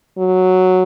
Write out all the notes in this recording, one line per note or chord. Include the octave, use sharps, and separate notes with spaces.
F#3